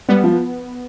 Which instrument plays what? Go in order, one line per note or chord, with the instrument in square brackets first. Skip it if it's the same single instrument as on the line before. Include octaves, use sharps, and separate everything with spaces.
[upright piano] G3 [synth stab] B3
[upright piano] F3